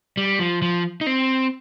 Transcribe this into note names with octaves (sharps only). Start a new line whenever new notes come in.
G3
F3
F3
D#4
C4